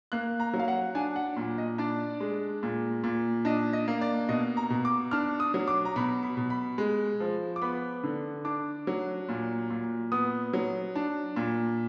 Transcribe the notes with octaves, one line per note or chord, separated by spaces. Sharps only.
A#3 F#6
A#5
F#3
F5
F#5
D4 G#5
F#5
A#2
D#5
D4 D5
G#3
A#2
A#2
D4 D#5
D#5
A#3
D5
B2 D#5
A#5
B2
D6
D4 F6
D#6
F#3
D6
A#5
B2 B5
B5
B2
B5
G#3
F3
D6
B3 B5
D3
D4 D6
F#3
A#2
A#2
B3 D#6
F#3
D4
A#2